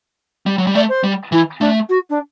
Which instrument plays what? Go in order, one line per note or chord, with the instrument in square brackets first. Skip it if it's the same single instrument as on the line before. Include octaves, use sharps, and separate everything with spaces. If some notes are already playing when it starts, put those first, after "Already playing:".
[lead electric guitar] G3
F#3
G3
[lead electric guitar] A3 [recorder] D5
[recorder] C5
[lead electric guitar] G3
[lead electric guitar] E3 [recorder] E4
[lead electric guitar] A3 [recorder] D4
[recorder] F#4
D4